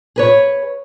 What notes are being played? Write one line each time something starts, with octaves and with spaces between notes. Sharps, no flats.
G#4 B4 C#5